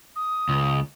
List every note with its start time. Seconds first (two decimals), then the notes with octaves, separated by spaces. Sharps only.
0.16 D#6
0.49 C#2